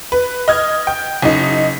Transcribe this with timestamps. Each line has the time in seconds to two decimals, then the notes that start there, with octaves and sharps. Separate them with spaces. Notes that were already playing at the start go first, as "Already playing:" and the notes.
0.12 B4
0.48 D#5 F6 G#6
0.87 G5
1.22 F#1 D#4